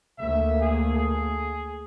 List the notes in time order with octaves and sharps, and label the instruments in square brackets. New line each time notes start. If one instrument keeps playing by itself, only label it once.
[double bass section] D2 A3 A#3 [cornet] E5
[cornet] G#4
G#4